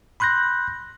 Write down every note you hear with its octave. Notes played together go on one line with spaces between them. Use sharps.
B5 C6 F#6 G6 A#6